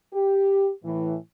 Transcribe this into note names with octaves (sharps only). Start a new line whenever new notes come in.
G4
A2 E3